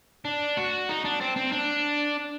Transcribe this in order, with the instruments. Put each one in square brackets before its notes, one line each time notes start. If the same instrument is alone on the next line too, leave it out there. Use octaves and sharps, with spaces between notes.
[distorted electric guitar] D4
F#4
D#4
D4
C4
C4
D4